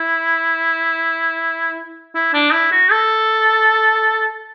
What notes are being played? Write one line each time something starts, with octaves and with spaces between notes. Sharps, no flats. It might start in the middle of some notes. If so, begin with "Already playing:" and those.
Already playing: E4
E4
D4
E4
F#4
A4